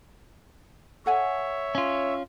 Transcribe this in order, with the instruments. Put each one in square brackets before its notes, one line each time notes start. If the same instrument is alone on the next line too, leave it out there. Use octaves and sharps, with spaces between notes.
[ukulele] A4 F#5 G#5 [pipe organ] C#5 E5
[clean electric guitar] C#4 F4